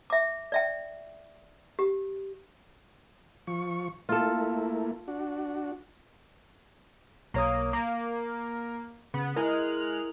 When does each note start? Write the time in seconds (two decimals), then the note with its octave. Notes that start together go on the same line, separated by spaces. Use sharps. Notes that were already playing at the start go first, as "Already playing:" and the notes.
0.10 E5 D6
0.52 D5 E5 G5
1.79 G4
3.47 F3 C#6
4.09 A3 A#3 E4 F4 A4
5.08 D4 F#4
7.34 B1 A#3 C#5 D#6
7.73 A#3 D6
9.14 C#3 B3
9.36 G#3 E4 A#4 F6 F#6